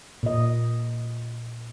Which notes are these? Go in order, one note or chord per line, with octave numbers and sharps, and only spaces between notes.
A#2 D#5